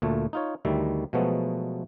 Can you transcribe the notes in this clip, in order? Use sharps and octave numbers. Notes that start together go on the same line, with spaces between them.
D2 A#2 A3
D#4 F4 C#5
D2 D#3 G3 E5
B2 F3 F#3 G#3 A3 B3